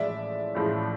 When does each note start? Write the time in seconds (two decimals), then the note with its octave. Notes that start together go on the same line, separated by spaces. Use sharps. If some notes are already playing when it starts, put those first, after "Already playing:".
Already playing: A1 A2 F3 G#3 D5 E5
0.55 A1 A2 F3 G#3